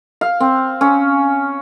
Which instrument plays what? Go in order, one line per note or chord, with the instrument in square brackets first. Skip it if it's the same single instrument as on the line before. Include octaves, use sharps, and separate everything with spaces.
[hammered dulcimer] F5
C4
C#4